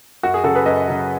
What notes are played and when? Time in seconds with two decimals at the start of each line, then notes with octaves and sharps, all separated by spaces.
0.23 F#2 F#4
0.34 G#4
0.44 C#3 F#3 F#4 A4
0.55 G#4 B4
0.66 F#2 B4 D#5
0.88 C#3 F#3